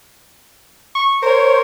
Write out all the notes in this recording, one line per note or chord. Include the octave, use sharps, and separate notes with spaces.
C#6
A#4 C5 C#5